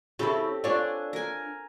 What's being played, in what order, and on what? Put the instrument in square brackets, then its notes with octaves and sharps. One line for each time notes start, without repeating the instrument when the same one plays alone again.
[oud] C#3 E4 [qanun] C4 G4 A4
[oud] D4 F4 C#5 [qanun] A4 G#5
[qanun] A#4 G#5